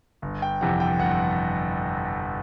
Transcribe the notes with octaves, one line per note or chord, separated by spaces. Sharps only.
G1
G5
F2 C3 E3 F#5
G5
G1 F#5